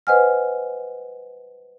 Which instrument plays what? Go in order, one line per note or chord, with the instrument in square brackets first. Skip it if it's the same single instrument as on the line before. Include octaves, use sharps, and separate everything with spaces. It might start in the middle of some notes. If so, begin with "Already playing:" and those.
[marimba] B4 C5 D#5 F#5 G#5 F6